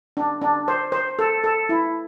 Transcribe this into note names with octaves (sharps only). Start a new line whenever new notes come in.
D4
D4
C5
C5
A4
A4
E4